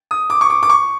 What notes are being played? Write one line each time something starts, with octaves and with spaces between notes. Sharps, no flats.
D#6
D6
C#6
D6
D6
C#6